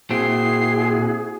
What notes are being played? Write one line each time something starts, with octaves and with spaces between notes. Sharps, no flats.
A#2 C4 E4 F#4 G#4 C7